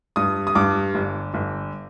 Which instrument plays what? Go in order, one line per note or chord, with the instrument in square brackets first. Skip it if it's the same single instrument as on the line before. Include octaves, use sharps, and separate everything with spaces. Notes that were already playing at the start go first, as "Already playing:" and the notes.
[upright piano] G2 D#6
D#6
G2 D6
G1
G1